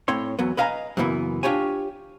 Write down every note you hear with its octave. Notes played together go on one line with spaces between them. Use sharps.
A2 C4 C#5 C6
E2 F#3 B3
B4 D#5 F5 G#5 A#5
F#2 A#2 C#3 E3 B3
D4 F4 G4 C#5 G#5